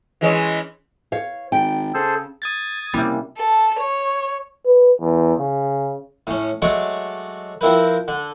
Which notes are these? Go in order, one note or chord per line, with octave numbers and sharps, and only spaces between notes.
E3 G#3 C#4
C#5 F5
G#1 G5
C#3 G#4 A4 C5
D#6 G#6 A6
C3 G3 A#3 C#4 E4
A4
C#5
B4
E2
C#3
A2 C#4
F#3 G#3 A3 C#5 D5
F3 C4 E4 A#4 B4
D3